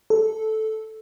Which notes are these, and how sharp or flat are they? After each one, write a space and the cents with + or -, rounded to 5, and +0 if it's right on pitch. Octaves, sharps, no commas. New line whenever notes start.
A4 -5